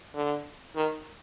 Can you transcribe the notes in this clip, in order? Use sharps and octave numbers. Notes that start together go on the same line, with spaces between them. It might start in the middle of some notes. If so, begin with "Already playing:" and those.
D3
D#3